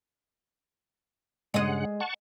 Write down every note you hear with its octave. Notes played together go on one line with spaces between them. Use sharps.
G2 C#3 G#3 D#5 F#5
F#5 A5 C#6